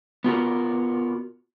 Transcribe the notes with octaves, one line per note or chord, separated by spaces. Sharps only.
B3 F4 F#4 A#4